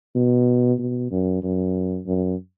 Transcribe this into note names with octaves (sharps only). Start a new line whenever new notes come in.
B2
B2
F#2
F#2
F#2